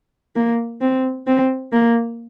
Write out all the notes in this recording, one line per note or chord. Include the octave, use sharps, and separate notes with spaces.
A#3
C4
C4
A#3